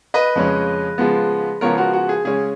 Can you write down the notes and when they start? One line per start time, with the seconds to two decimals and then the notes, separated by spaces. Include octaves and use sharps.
0.14 B4 D#5
0.36 F2 C#3 G#3 C#4
0.98 C#3 F3 G#3 B3
1.61 C#3 F3 G#3 B3 A#4 C#5
1.77 F#4 A#4
1.93 F#4
2.09 G#4
2.25 C#3 G#3 C#4 G#4